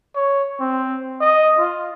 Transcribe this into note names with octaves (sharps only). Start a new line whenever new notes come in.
C#5
C4
D#5
F4